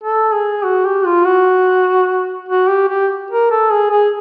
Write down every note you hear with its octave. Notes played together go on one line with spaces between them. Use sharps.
A4
G#4
F#4
G4
F4
F#4
F#4
G4
G4
A#4
A4
G#4
G#4